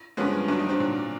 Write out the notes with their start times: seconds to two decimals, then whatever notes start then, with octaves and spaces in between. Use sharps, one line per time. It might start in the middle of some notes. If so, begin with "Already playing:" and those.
0.17 G2 D3 F3 G#3 B3 C#4
0.48 G2 D3 F#3 D4
0.59 D#4
0.69 C4 D4
0.80 A#2 F#3